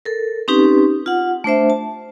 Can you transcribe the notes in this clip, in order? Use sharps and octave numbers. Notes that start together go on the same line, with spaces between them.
A4 A#4
C4 C#4 D#4 G4 B4
F4 F#5
A3 D4 C5 E5
A5